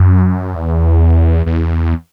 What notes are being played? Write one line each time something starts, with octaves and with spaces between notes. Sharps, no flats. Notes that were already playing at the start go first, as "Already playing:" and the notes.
Already playing: F#2
E2
E2